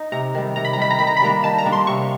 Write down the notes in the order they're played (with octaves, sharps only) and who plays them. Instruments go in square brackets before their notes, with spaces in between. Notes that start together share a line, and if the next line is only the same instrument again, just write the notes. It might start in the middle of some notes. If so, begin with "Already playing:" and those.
Already playing: [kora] D#4
[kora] C3 [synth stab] A#5
[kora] D#3 G3
[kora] C3 [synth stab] A#5
[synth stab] B5
A#5
[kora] D#3 G3 [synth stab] B5
[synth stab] A#5
[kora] D#3 [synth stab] B5
[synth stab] A#5
B5
[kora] G3 A#3 D4 [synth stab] A#5
[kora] D#3 [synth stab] A5
[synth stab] A#5
[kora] G3 A#3 D4
[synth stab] C6
[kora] C3 [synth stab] C#6